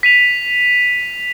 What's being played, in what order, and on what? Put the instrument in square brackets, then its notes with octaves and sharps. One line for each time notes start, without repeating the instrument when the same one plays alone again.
[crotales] B6 D#7 F7